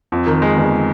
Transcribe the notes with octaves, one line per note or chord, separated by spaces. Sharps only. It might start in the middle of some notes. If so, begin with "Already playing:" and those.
F2
D#3
G#3
G1